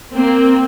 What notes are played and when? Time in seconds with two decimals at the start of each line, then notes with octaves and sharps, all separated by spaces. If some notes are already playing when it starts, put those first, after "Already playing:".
0.14 A#3 C4